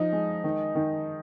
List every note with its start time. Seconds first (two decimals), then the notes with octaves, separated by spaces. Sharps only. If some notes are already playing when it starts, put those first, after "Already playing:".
Already playing: F3 D#4
0.12 G#3
0.44 D#3
0.75 D#3